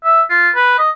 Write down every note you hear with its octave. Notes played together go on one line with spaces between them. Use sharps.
E5
F4
B4
D#5